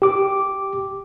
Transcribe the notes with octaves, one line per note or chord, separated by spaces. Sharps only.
G4 D6